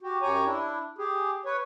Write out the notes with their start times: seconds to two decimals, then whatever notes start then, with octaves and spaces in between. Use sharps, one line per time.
0.01 F#4 G4
0.22 F#2 G4 C#5 G#5 A#5
0.45 D4 E4
0.98 G4 G#4
1.46 B4 C#5